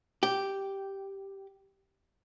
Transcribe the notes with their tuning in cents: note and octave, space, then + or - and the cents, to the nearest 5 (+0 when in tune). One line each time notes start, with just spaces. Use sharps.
G4 -5